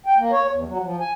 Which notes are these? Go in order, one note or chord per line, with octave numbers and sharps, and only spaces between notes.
G5
A#3
C#5
E2
F#3
F3
G#5